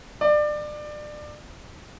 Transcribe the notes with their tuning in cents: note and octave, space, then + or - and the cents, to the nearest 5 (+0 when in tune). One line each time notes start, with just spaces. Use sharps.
D5 +25